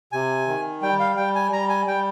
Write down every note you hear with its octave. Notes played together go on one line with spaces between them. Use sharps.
C3 G#5
D#3
G3 G5
F5
G3 G5
G#5
G3 A#5
G#5
G3 G5